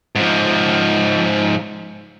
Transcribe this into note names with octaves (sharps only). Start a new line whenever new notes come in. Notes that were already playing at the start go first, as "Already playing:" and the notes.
G#2 F3